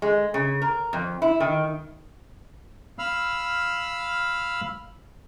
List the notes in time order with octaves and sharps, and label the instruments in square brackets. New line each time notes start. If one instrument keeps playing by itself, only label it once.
[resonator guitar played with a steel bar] G#3
C#3
A#4
F2
E4
D#3
[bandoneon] F5 B5 E6 F6